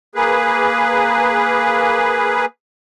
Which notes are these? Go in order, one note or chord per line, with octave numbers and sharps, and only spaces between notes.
A#3 G#4 B4